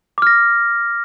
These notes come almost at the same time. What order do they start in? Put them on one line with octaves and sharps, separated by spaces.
D6 F6 A#6